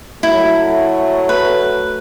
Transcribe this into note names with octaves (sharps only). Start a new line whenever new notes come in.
F#3 A3 E4
B4